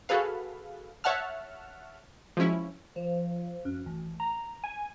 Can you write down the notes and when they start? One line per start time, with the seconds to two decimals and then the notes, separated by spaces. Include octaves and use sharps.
0.09 F#4 G#4 A4 B4 F5
1.04 C#5 E5 F#5 A5 F6
2.37 F3 F#3 G#3 C#4 E4
2.96 F3
3.65 F#2
3.86 A1
4.20 A#5
4.64 G#5